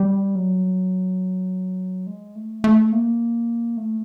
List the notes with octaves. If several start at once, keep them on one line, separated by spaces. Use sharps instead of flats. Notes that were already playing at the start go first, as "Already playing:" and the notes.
Already playing: G3
F#3
G#3
A3
A3
A#3
A3